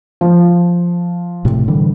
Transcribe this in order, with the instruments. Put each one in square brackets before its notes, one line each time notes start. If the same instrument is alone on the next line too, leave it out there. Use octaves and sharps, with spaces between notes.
[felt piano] F3
[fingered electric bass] A2 C3
D3 E3 G3